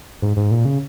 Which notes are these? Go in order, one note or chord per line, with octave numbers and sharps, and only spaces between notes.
G#2
G#2
A#2
C#3